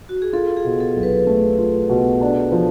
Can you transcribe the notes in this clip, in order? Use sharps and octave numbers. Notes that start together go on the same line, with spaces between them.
F#4
G#4
F4 A4
G#4
B2
A4
B1
B4
A3
F4
B2
D4
F3